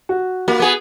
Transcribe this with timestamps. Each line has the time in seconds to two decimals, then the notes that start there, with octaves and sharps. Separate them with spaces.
0.09 F#4
0.48 A#3 F#4
0.60 B3 G#4